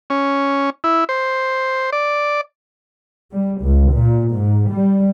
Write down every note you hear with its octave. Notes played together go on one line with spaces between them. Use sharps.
C#4
E4
C5
D5
G3
C#2
A#2
G#2
G3